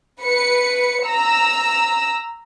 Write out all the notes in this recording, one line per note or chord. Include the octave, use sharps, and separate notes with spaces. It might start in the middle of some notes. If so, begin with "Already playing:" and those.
B4 C#7
A#5 E6